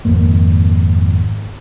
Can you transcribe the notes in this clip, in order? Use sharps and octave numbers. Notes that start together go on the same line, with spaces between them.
G#1 F2 G#2 A#3